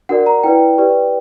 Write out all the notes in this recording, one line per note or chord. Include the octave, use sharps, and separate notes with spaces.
D4 F#4 A#4 D5 F#5
A#5
E4 B4 D5 G5
G4 B4 D5